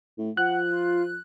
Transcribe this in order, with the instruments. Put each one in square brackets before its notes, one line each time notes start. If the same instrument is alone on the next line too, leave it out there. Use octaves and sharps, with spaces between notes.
[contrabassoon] A2
[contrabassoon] F3 [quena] F#5 [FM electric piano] F#6
[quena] F4